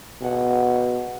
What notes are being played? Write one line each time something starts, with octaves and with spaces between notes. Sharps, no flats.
B2 G#4 F#5